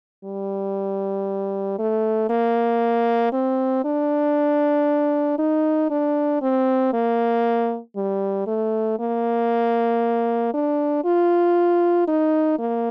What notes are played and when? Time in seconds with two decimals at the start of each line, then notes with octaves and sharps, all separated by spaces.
0.24 G3
1.79 A3
2.30 A#3
3.33 C4
3.85 D4
5.38 D#4
5.90 D4
6.42 C4
6.93 A#3
7.96 G3
8.47 A3
8.99 A#3
10.54 D4
11.04 F4
12.08 D#4
12.59 A#3